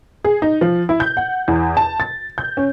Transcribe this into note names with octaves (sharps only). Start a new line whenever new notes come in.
G#4
D#4
F3
E4
G6
F#5
E2
A5
A6
G6
C#4